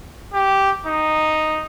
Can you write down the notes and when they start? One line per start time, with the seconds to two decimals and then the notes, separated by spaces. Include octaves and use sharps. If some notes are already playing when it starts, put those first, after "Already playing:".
0.34 G4
0.86 D#4